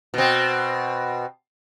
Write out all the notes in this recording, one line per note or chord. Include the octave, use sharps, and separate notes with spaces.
B2 C4